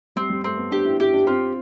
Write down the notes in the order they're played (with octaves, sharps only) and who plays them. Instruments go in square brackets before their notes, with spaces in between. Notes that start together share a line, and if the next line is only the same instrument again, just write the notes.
[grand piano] G3 [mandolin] C4
[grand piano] G3
[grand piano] A3 [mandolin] C4
[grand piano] B3
[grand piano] D4 [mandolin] G4
[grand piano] E4
[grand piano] E4 [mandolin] G4
[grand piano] D4
[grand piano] C4 [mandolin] F4